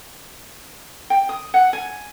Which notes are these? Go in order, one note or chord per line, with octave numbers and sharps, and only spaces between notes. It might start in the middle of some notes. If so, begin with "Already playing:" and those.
G5
D#6
F#5
G#5